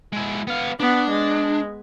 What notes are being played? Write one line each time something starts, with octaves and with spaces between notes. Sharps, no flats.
G#3 E4
B3 F5
B3 D4
G#3